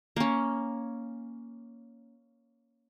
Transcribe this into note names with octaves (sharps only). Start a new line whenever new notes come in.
A#3 C#4